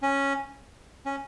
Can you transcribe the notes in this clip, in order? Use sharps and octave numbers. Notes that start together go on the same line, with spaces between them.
C#4
C#4